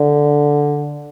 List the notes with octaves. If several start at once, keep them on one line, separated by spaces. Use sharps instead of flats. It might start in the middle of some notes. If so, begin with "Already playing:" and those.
Already playing: D3